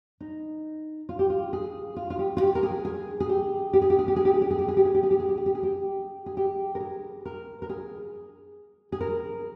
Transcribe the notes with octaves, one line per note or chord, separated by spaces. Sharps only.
D#4
F4
G4
F4
G#4
F4
F4
G4
F4
G4
A#4
G#4
G#4
G#4
G4
G4
G#4
G4
G#4
G4
G#4
G4
G#4
G4
G#4
G4
G#4
G4
G#4
G4
G#4
G4
G#4
G4
G#4
G4
G#4
G4
G#4
G4
A#4
G#4
A#4
A#4
G#4
G#4
A#4